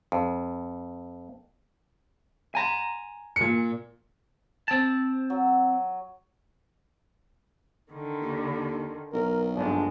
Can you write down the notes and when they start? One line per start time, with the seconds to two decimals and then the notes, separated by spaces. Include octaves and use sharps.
0.12 F2
2.55 G#5 A#5
3.36 A#2 C#7
4.68 C4 A5
5.30 F#3
7.93 D3 D#3
8.22 D#2
9.13 B1 A#4
9.55 A#1 G2 D3 G#3 D4